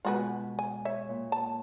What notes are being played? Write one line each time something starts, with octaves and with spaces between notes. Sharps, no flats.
B2 G#3 F4 F#4 B4
G#5
C#5 E5
A#2
A5